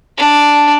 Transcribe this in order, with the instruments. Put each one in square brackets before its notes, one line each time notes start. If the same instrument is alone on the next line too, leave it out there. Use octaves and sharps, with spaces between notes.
[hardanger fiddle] D4